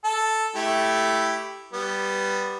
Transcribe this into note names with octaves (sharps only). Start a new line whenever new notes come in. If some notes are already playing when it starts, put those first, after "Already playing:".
A4
A3 E4 G4
G3 B3